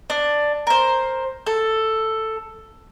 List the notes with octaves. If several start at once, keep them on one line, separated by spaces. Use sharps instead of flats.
D4
A#4 C5
A4